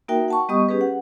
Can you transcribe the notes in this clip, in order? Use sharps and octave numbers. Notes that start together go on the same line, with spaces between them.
A#3 D#4 F#4 A#4 E5 G5
F#5 A5 C#6
G3 B3 G4 D#5 C#6 D#6
C#4 G4 G#4 B4
F#5